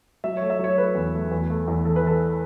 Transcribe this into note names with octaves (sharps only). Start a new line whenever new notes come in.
F#3 E5
A3 C#5
E5
F#3 C#5
A3 B4
E2
A3
E2
A3
E2
E3 A4
B4
E3 A4